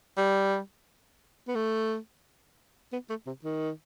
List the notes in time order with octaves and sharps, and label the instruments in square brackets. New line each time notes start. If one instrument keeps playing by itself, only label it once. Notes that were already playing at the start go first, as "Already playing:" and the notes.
[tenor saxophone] G3
B3
A3
B3
A3
C3
D#3